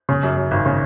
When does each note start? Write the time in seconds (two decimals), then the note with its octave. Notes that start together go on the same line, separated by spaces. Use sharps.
0.09 C#3
0.23 F#2
0.37 F#2
0.51 G#1
0.66 C#3